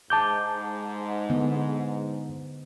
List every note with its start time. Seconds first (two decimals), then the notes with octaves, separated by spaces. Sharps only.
0.10 G#2 A5 D6 G6
1.30 D3 B3